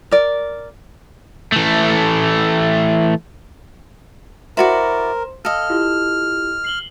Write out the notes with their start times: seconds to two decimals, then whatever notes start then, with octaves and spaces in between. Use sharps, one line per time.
0.11 A#4 D5
1.52 E3 A3
4.57 E4 F#4 A#4 C5 D5 C6 E7
5.45 A4 D#5 F5 F6
5.70 E4 F4 G4
6.64 C7 F#7 G7